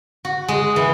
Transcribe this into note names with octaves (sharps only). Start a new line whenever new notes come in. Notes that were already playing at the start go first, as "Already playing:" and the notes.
F#4
G#3
E3